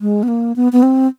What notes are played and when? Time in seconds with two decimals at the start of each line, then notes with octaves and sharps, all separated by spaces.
0.01 G#3
0.23 B3
0.28 A#3
0.56 B3
0.73 B3
0.83 C4